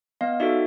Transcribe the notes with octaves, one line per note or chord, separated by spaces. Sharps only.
B3 D#5 F5
D#4 F#4 A4 D5 E5